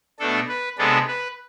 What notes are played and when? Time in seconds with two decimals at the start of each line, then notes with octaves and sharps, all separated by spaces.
0.19 B2 A3 D4 A4
0.48 B4
0.78 C3 G#3 B3 D4 A4
1.07 B4